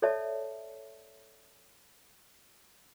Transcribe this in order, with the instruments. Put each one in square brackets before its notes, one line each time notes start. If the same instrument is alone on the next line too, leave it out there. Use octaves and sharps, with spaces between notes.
[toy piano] A4 C#5 D5 E5 A5